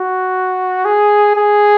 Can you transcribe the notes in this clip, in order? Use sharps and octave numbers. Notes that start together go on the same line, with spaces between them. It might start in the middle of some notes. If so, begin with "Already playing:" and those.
Already playing: F#4
G#4
G#4